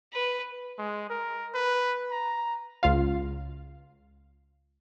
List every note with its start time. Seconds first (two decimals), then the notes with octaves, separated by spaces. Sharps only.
0.13 B4
0.78 G#3
1.10 A#4
1.54 B4
2.11 A#5
2.83 C#2 F4 F5